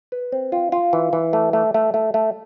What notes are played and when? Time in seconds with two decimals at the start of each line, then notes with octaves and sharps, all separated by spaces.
0.12 B4
0.32 C4
0.52 F4
0.72 F4
0.93 E3
1.13 E3
1.33 A3
1.53 A3
1.74 A3
1.94 A3
2.14 A3